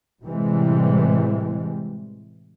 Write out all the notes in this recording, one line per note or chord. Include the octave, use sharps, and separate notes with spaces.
A2 C3 E3 G3 G#3